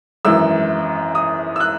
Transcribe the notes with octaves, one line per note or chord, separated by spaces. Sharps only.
G#1 F#2 E3 E6
D#6
E6
F#6